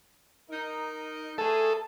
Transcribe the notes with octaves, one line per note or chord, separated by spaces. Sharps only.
D#4 A#4
A3 G#4 A4